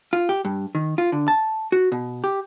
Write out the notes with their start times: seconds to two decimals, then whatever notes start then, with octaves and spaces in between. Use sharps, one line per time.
0.13 F4
0.29 G4
0.45 G2
0.75 D#3
0.98 F4
1.12 D3
1.28 A5
1.72 F#4
1.92 B2
2.24 G4